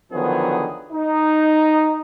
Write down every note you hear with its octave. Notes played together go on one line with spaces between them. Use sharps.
D3 D#3 F3 F#3 B3 G#4
D#4